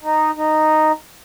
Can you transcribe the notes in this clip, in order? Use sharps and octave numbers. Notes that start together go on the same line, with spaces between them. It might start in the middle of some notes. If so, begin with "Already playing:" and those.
D#4
D#4